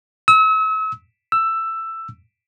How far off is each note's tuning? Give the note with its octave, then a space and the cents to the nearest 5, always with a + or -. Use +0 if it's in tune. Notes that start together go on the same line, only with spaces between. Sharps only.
E6 -40
E6 +10